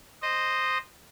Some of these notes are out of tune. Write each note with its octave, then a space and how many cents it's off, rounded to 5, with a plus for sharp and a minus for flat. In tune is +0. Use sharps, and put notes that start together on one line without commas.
C5 +0 D#5 -10